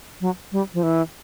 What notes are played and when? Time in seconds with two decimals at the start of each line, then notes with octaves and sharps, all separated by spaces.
0.21 F#3
0.52 G3
0.74 F3
0.83 E3